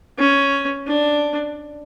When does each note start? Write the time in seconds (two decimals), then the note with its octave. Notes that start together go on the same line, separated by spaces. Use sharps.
0.19 C#4
0.87 D4